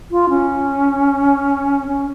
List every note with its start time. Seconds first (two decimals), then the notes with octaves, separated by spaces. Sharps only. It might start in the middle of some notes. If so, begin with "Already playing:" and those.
0.11 F4
0.29 C#4
1.87 C#4